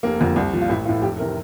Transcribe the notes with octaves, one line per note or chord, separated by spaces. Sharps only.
F1 A#3
F2 D3
C2
A#2 F3
F4
A1 E4
A2 E3 F4
F1 G4
C3 E3 A#4